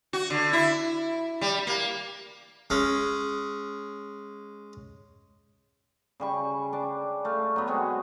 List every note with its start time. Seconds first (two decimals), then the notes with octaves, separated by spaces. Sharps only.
0.13 F#4
0.30 D3
0.53 E4
1.41 G3
1.67 A#3
2.70 G#3 C#4
6.20 C#3 G3 C#6
6.73 D4 D6
7.25 A3 F5
7.56 F#3 B3
7.67 G#3 B3 C4 F#4